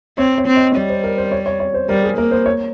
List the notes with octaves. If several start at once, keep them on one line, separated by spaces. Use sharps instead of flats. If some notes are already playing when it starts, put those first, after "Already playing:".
C4 C#5
C#5
C4
D#5
G3 C#5
C5
A#4
C5
C#5
C#5
C#5
C5
G3 A#4
G#4
A#3 A#4
C5
C#5